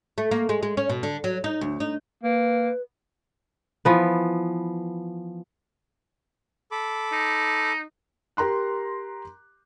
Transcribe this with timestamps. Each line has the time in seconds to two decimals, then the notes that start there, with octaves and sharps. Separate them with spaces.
0.18 A3
0.31 A#3
0.49 G#3
0.63 G#3
0.77 C#4
0.90 B2
1.03 D3
1.24 F#3
1.44 D#4
1.61 D2
1.80 D#4
2.24 A#3 B4
3.85 E3 F3 B3
6.71 A4 B5 D6
7.12 D#4
8.37 G4 A#4 A#5 C6 F#6